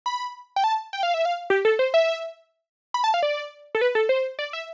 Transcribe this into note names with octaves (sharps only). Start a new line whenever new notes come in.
B5
G5
A5
G5
F5
E5
F5
G4
A4
C5
E5
B5
A5
F5
D5
A4
B4
A4
C5
D5
E5